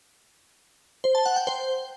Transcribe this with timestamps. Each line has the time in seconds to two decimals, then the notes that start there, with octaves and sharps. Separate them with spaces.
1.04 C5
1.15 A5
1.26 F#5
1.36 G5
1.47 C5